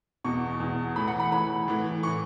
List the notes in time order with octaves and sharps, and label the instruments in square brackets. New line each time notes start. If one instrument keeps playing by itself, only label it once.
[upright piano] E2 B2 C#6
E2 B2
A2 E3 B5
F#5
B5
A2 E3 B5
A2 E3
A2 E3 C#6